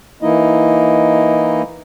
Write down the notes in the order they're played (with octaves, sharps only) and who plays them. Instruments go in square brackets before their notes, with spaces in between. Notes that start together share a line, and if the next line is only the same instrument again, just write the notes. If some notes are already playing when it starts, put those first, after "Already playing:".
[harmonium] E3 A#3 D#4 E4 D#5